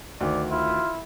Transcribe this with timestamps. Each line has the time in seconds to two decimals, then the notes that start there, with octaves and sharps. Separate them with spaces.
0.21 D2 D#3 D5
0.50 E4 F4